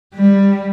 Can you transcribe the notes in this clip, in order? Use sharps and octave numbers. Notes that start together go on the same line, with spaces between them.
G3